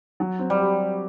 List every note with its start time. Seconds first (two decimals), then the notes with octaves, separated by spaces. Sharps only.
0.20 F#3
0.39 C4
0.50 G3
0.59 G4